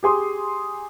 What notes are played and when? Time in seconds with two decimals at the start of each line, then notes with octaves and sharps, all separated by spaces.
0.03 G4 G#4 C6 D#6